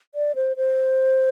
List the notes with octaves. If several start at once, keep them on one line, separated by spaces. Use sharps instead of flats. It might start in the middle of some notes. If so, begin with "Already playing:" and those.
D5
C5
C5